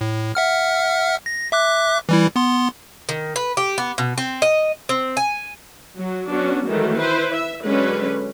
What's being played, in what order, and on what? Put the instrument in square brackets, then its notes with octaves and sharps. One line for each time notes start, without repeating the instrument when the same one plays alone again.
[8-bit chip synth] A2
E5 F#5 F6
A#6
E5 D6 F#6
E3 G3 E4
B3 C6
[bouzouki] D#3
B4
G4
B3
B2
C4
D#5
C4
G#5
[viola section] F#3
F#3 B3 C#4 D4 F#4
D#3 E3 F#3 G#3 A3
E4 B4 C5
E5
D3 F#3 G#3 C#4 B4